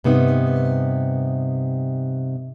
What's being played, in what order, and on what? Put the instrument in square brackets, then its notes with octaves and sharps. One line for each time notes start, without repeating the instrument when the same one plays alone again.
[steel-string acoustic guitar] G2 C3 B3 D#4